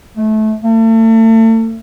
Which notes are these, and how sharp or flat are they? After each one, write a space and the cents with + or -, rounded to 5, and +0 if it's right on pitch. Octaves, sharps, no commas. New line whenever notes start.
A3 -25
A3 +35